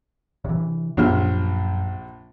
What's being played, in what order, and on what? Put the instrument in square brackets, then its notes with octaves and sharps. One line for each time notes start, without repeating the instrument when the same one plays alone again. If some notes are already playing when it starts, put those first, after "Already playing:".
[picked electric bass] C3 E3
[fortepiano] A#1 C3 F6 [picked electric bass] F#2